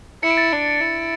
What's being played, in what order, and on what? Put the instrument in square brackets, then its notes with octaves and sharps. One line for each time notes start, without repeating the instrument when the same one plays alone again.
[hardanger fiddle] E4 [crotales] C#7
[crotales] D7
A6 C#7
[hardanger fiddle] D4
E4